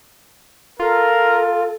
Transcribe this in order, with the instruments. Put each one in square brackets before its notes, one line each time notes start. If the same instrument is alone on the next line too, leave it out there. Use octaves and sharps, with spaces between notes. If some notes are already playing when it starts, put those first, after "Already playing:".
[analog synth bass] F4 [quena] A4 [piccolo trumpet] A#4